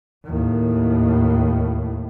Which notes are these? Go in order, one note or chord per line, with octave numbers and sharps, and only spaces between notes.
D#2 A2